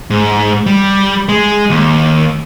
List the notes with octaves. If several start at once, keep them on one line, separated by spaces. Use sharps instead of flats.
G#2
G3
G#3
D#2